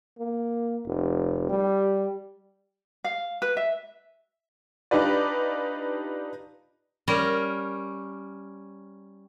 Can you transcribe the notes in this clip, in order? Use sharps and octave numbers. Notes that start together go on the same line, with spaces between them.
A#3
F1
G3
F5
B4
E5
D4 D#4 F4 G4 B4 D5
G3 C#4 A#4